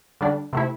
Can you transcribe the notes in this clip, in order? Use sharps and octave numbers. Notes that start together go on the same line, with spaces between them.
D3 G3 D4
C3 A3 E4